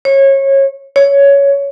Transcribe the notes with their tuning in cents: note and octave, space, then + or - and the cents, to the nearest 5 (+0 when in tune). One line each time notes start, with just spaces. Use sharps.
C#5 -25
C#5 +10